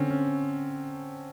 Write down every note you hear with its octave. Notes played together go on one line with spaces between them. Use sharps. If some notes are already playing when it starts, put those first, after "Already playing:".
Already playing: D3 C4 C#4
C#4